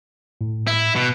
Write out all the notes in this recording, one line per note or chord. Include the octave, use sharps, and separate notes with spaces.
A2
E4
B2